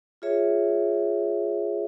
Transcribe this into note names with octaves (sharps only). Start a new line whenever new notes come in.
F4 G#4 C#5 E5